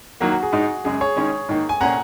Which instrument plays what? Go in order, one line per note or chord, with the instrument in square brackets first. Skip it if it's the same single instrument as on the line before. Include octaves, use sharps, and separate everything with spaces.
[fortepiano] D#3 F#3 A#3 [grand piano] F#4
[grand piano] F#4
G#4
[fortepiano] G#2 G#3 D#4
[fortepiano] F#2 C#3 G#3 [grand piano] G#4
[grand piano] G#4 C#5
[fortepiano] D#3 G#3 C#4
G#2 D#3 A#3
[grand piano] G#5
[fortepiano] A#2 A#3 C#4 [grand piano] F#5 A#5